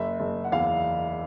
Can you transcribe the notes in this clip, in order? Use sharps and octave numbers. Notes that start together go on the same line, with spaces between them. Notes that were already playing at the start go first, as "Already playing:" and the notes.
Already playing: F#1 E5
F#1
F#5
E2 F5